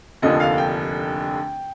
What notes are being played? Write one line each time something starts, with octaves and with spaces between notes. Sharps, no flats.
F1 D#2 D3 F3 D#5
F5
G5